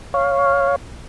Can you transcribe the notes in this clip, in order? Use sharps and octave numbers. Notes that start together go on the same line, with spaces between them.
C#5 F5